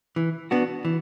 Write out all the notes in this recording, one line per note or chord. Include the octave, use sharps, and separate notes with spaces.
E3
B3 D4 F#4
E3